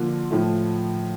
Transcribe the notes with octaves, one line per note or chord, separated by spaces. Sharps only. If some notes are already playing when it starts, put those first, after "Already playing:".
Already playing: D3 F3 A#3 F4
A2 F3 A3